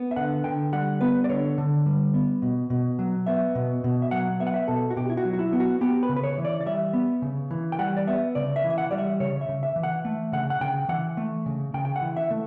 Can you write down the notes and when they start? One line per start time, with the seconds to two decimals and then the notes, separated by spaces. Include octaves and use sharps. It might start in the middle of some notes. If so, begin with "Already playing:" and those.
Already playing: B3
0.11 E5
0.16 D3 F#5
0.44 D3 G5
0.73 G3 F#5
1.01 B3 B4
1.24 D5
1.29 D3 C#5
1.58 D3
1.86 G3
2.14 B3
2.42 B2
2.70 B2
2.99 F#3
3.26 B3 E5
3.55 B2
3.84 B2
4.02 E5
4.11 F#3 F#5
4.40 B3 E5
4.47 F#5
4.54 E5
4.68 B2 A4
4.91 F#4
4.96 B2 G4
5.10 E4
5.17 F#4
5.25 F#3
5.33 F#4
5.39 E4
5.53 B3
5.60 F#4
5.81 B3 G4
6.03 B4
6.09 C#3
6.16 B4
6.24 C#5
6.38 E3
6.45 D5
6.61 D5
6.66 G3 E5
6.93 B3
7.22 C#3
7.51 E3
7.72 G5
7.79 G3 F#5
7.97 D5
8.07 B3 E5
8.35 C#3 D5
8.56 E5
8.64 E3
8.70 E5
8.78 F#5
8.91 G3 D5
8.98 E5
9.20 C#3 C#5
9.41 E5
9.49 C#3
9.63 E5
9.76 E3
9.83 F#5
10.05 A3
10.33 C#3 F#5
10.50 F#5
10.61 C#3 G5
10.89 E3 F#5
11.17 A3
11.46 C#3
11.74 C#3 G5
11.85 G5
11.96 F#5
12.02 E3
12.17 E5
12.31 A3